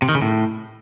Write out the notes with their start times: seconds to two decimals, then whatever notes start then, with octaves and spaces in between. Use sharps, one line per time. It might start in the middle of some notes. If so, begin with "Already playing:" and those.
0.02 C3
0.09 D#3
0.15 C#3
0.22 A2